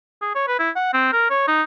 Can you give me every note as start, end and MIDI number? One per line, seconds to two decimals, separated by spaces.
0.22 0.33 68
0.35 0.47 73
0.48 0.57 71
0.59 0.70 64
0.76 0.90 78
0.93 1.11 60
1.13 1.26 70
1.30 1.46 73
1.47 1.63 63